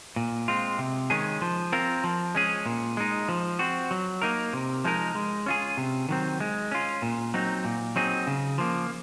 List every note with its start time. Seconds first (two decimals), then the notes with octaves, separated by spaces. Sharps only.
0.16 A#2
0.48 G#3 C4 F4
0.78 C3
1.10 D#3 G#3 C#4 G#4
1.41 F3
1.72 C4 F4 A#4
2.04 F3
2.35 G#3 C#4 G#4
2.66 A#2
2.97 G#3 D#4
3.28 F3
3.59 C4 F#4
3.91 F#3
4.22 A#3 D#4 A#4
4.53 C3
4.84 F3 G#3 D#4 A#4
5.15 G#3
5.46 C#4 F4 G#4
5.77 C3
6.09 D#3 F#3 C4
6.40 G#3
6.71 C#4 F4
7.02 A#2
7.34 F#3 C4 D#4
7.65 A#2
7.96 F#3 C4 D#4 G#4
8.27 C#3
8.58 F3 A#3